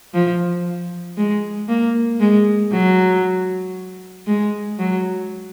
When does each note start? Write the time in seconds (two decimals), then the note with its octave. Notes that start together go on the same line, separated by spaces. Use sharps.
0.14 F3
1.17 G#3
1.69 A#3
2.20 G#3
2.72 F#3
4.27 G#3
4.79 F#3